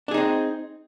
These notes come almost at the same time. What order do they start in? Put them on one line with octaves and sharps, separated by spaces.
D4 G#4 D#4 C4